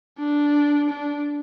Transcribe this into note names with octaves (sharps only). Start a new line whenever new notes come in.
D4
D4